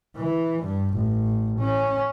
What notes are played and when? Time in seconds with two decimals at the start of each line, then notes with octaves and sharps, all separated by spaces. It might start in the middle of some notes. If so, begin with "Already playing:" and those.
0.16 E3
0.63 G2
0.94 A1
1.59 C#4